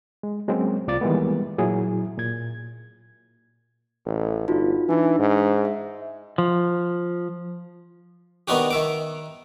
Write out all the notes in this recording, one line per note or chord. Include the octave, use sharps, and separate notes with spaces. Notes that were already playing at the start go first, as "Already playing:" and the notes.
G#3
F#3 G#3 A#3 C4 C#4
C2 F4 D5 D6 A6
D#3 E3 G3 G#3 A#3 B3
A#2 F#3 E4 G#4
A#2 G#6
A1
G1 D#4 F4 F#4
E3 D4 D#4
G#2
E5
F3
D#3 B3 D4 D#4 F#4 G4
D#3 E5 D6